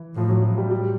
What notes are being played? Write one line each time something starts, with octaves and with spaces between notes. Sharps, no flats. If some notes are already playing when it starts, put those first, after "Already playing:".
Already playing: E3
A2 F3
F#3
F#3
G3
G3